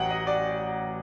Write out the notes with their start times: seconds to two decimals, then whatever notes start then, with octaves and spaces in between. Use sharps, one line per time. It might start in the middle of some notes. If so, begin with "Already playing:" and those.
Already playing: A1 F#3 D#5 F#5 G5
0.11 D#5
0.27 D5